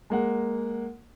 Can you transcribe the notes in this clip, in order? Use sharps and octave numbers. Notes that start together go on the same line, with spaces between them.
G#3 A#3 F#5